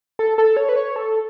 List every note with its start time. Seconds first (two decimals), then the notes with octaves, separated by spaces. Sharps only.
0.19 A4
0.38 A4
0.57 C#5
0.69 B4
0.76 C#5
0.96 A4